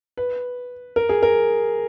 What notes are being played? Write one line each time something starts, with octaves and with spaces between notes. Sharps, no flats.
B4
A#4
G#4
A#4